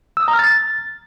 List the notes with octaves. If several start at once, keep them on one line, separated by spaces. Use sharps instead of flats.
E6
D#6
A#5
F6
A6